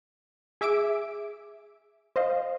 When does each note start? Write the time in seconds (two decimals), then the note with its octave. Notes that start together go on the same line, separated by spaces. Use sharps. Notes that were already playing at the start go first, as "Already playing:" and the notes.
0.61 G#4 E5 D6 E6 D7
2.16 C5 D#5 F5